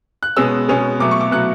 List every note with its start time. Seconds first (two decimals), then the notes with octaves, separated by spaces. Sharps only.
0.23 F#6
0.37 B2 G#3 C#4 E6
0.68 B2 G#3 C#4
0.99 B2 F#3 A3 D6
1.11 C#6
1.21 D6
1.31 B2 F#3 A3 F#6